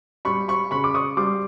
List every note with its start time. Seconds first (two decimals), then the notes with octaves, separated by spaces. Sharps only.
0.25 G3 B5 C#6
0.48 B5 C#6
0.71 C#3 B5 C#6
0.84 D6
0.94 C#6 D#6
1.17 G3 C6 D6